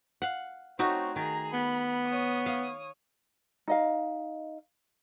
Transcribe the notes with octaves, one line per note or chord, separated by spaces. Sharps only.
F5 F#5
A3 C4 D#4 F#4 C#5
D#3 G#4 A#5
B3 B5
C#5 D#6
F5
D#4 D#5 F5